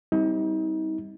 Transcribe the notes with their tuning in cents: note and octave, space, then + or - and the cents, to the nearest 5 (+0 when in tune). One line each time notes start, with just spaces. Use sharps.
G3 +5 C4 -5 D#4 +40